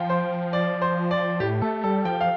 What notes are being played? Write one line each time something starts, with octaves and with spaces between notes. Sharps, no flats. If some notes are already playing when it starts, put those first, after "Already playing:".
Already playing: F3 F5 G5
C5
D5
C5
D5
A2 G4
A3 A4
G3 A4
F3 G5
F5